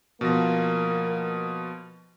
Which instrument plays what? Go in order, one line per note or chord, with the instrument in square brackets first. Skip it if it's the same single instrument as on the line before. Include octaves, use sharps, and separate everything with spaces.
[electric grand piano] B2 F3 A#6 [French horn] A#3